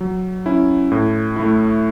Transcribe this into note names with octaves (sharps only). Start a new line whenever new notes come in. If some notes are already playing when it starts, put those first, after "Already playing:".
F#3
C#4 E4
A2
A3 E4